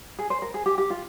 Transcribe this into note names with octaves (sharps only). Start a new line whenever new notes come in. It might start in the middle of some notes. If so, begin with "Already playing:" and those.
G#4
C5
A#4
G#4
G4
G4
F4